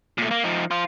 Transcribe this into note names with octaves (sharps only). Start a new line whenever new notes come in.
A#2 A3
A#3
F3 D#4
F4 C5